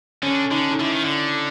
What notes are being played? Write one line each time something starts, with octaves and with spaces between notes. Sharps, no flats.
D3 C#4
D3 D#4
D#4
D3 E4
D#3
D3